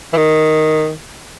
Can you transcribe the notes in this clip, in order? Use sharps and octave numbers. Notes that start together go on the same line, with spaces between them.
E3
D#3